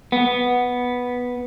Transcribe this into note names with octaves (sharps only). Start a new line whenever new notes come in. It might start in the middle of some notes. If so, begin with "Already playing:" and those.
B3